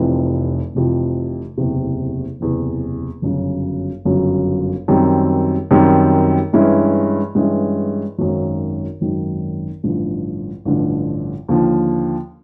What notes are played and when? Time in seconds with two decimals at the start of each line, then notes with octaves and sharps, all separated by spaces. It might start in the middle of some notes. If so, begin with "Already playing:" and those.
Already playing: F1 F2 C3 E3
0.75 F1 F2 C3 E3
1.58 F#1 E2 C3
2.40 F#1 E2 C3
3.22 G1 F#2 C#3 F#3
4.05 G1 F#2 C#3 F#3
4.88 F#2 D#3 G3 C4
5.71 F#2 D#3 G3 C4
6.53 G2 E3 G#3 C#4 E4
7.35 G2 E3 G#3 C#4 E4
8.18 G#1 F#2 D#3 F#3
9.01 G#1 F#2 D#3 F#3
9.84 A1 G2 D3 F3
10.65 A1 G2 D3 F3
11.49 D#2 D3 F3